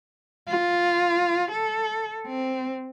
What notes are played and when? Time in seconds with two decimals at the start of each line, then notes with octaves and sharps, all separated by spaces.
0.48 F4
1.51 A4
2.27 C4